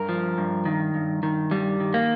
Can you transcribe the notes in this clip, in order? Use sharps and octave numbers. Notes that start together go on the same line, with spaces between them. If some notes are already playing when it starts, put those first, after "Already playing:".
Already playing: G2 A#4
F3
G2
D#3
G2
D#3
G2 G3
D#3
A#3